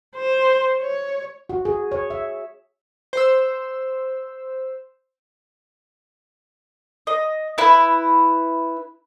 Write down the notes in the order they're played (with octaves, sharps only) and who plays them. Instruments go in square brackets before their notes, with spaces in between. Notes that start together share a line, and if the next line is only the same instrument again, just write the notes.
[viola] C5
C#5
[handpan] F#4
G#4
C#5
E5
[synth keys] C5 E6
[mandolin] D#5
E4 B4